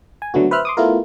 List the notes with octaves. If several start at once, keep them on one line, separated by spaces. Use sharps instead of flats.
G#5
D3 F#3 A3 B3 F#4
B4 C5 E5 F6 F#6
C6 D6 D#6
A3 B3 E4 F4 A#4